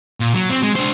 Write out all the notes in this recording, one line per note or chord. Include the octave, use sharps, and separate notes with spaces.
A#2
F#3
C4
G#3
D4 C5